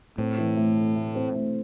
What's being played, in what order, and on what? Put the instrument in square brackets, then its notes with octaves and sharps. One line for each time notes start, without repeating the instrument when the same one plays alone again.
[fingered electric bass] A2 [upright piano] C4
[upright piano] E3
A3
A3
A3
C4
A3